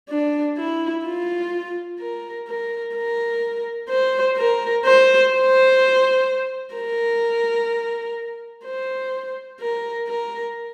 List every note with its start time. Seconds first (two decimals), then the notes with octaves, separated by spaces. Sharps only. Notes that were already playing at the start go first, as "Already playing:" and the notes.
0.09 D4
0.58 E4
1.05 F4
1.99 A#4
2.48 A#4
2.95 A#4
3.89 C5
4.37 A#4
4.85 C5
5.33 C5
6.75 A#4
8.64 C5
9.60 A#4
10.07 A#4